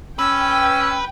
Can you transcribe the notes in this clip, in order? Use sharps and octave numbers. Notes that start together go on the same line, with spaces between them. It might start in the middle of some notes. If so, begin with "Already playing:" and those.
C#4 B4 G5 E6